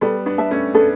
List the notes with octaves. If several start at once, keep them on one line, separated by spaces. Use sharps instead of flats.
G3 B3 A4
B3 D4
E5 A5
A3 C#4
B3 D4 A4